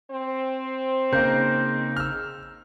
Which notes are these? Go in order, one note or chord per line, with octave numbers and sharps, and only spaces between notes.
C4 C5
C#3 A#3 D#4 A#4 G6
E6 F6